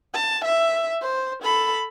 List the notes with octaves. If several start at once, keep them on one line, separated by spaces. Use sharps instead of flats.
A5
E5
C5
A4 B5